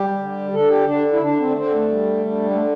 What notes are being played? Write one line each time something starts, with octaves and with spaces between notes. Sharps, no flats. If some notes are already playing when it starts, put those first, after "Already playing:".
Already playing: G3 G4
D3
D3 A4
G4
D3 D4
E4
D3 D4
C4
A3
D3 C4
A3
G3
D3
A3